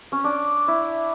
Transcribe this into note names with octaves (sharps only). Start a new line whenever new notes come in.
C#4
D4
E4